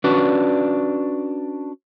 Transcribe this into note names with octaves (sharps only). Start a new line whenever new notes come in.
C#4 D4 F#4 B4 D5